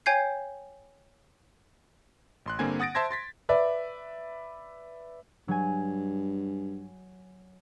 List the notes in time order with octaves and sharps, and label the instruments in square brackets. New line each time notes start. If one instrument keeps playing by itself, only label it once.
[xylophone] C#5 G5 G#5 G6 G#6 C7
[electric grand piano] A1 C6 F#6
G2 D3 A#3 C4 G#5 G#6
F#5 D#6 A6 A#6 D7
C5 E5 A5 C6 G#6 A#6
C6 A6 B6
[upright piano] B4 D5 E5
[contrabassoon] G2 [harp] F#3 G#5